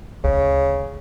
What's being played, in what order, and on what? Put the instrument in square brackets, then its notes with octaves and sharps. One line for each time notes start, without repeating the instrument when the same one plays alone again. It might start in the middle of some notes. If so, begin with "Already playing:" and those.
[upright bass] D2 [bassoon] C#3